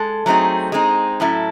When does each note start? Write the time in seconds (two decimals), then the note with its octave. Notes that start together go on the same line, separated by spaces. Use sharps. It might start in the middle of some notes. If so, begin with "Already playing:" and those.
Already playing: G#3 A4
0.26 F#3 A3 C4 D#4 G#4
0.72 G#3 C4 D#4
1.20 A2 F#3 C#4 E4 A4